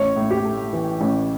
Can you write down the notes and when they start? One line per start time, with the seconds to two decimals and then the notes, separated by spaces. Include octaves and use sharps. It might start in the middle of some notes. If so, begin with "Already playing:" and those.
Already playing: A1 C#5
0.16 A2
0.31 G4
0.45 A3
0.73 E3
1.01 A1